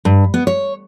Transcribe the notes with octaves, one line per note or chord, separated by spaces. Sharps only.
G2
B3
C#5